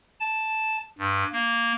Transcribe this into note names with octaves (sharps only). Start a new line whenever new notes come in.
A5
G2
A#3